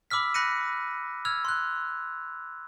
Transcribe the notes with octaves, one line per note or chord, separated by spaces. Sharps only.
B5 D6 E6 F6 B6
B5 F#6 A#6 C#7 D#7
E6 F6 G#6 F7
C6 F#6